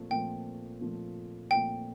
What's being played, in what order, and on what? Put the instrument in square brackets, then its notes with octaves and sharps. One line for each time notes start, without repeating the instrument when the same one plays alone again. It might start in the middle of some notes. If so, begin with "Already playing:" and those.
Already playing: [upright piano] A#2 F3 A3 C4
[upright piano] A#2 F3 A3 C4 [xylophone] G5
[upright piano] A#2 F3 A3 C4
[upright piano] A#2 F3 A3 C4 [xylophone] G5